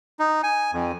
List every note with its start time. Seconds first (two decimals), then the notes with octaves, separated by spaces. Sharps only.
0.20 D#4
0.43 G#5
0.72 F2